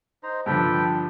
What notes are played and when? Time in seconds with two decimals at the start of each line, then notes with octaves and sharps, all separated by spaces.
0.23 D#4 C5 A#5
0.46 G2 D3 F3 A4 B4 G5
0.89 G3